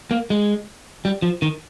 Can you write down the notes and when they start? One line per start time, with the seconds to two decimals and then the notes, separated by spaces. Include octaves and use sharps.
0.11 A#3
0.30 G#3
1.05 G3
1.22 F3
1.42 D#3